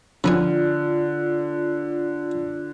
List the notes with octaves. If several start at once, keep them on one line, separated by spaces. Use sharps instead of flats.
D3 F3 B3 F4 D5 G#5